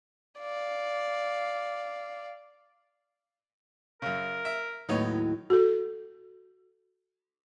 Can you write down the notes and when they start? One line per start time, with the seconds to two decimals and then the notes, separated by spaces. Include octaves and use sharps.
0.40 D5 F5
4.02 F#2 C#3 A#4
4.45 E5
4.89 D#2 A2 F#3 B3 D#4 C#5
5.50 F#4 A4